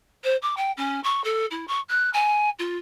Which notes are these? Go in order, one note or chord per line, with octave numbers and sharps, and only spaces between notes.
C5
D6
G5
C#4
C#6
A4
E4
C#6
F#6
G#5
F4